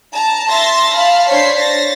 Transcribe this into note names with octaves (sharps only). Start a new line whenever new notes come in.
A5 A#5
E5 C6 A6 A#6
F5 A5 B5 F6
D4 C5 C#5 B6 C7
A6 A#6